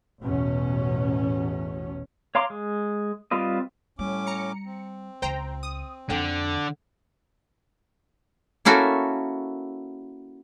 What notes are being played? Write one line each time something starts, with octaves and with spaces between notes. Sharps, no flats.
A1 E2 B2 C#4
C#5 F5 A#5 C6 D6
G#3
G3 C4 F4 B4 D#5
A2 G3 C#4 D6
A#5 C#7
C4
C#2 F4 C5 G5 A#5
D#6
F2 D3 G5
A#3 C#4 E4 F#4 A4